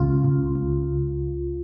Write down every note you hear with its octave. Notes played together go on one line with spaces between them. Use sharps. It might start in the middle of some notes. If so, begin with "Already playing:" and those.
Already playing: C#2 F4
C#2
C#2